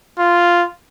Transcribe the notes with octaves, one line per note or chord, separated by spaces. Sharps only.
F4